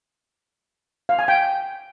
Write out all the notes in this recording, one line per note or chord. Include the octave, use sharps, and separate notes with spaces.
F5
G#5
G5